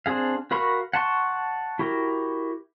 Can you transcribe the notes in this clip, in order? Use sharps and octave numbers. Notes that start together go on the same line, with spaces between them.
C4 D4 G#4 F5
F#4 A#4 F5 B5 C#6
F#5 A5 C6 C#6
E4 F#4 G4 A#4